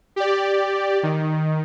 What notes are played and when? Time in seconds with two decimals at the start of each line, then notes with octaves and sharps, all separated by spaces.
0.16 G4 D5
1.03 D#3